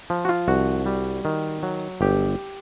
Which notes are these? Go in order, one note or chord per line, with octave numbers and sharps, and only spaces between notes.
F3
F#4
F4
C2 F#4
G3
D#3
F#3
G1 G4